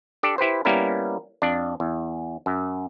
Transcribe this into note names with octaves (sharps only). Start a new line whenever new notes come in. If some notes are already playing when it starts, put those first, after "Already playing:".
D4 G4 A4 D5
E4 G4 B4 C5
G3 A#3 B3 C#4 E4 A#4
F2 D4
E2
F#2